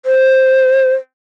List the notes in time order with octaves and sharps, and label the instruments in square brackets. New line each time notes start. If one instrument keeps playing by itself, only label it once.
[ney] C5